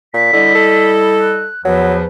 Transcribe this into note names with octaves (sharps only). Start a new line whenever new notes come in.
A#2 B6
D3 G3 E4 D#5
A4
F#6
E2 F3 F#3 B4